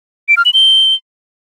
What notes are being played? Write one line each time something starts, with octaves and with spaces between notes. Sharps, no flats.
D7
F6
F#7
G7